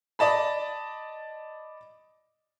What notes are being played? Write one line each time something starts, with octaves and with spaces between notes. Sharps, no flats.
D5 D#5 A5 B5